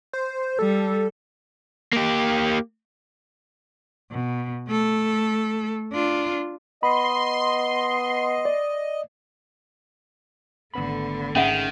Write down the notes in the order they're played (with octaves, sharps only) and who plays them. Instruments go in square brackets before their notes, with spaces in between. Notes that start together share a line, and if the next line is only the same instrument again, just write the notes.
[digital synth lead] C5
[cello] G3 [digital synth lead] A4
[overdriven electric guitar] A#3 G4
[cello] B2
A3 A4
D4 F4
[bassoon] B3 [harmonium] D#5 [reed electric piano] B5 [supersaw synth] C6
[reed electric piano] D5
[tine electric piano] G#1 B3 B5 [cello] D3 A3
[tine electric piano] G#1 G#4 B6 [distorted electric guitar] D#3 [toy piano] C#4 E5 F#5